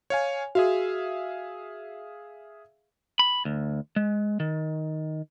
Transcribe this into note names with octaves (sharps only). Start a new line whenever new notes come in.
C#5 F5 G#5
F#4 G#4 E5 F5
B5
D2
G#3
D#3